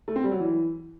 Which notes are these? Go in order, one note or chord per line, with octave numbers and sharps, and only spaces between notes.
A3
C4
G3
F#3
E3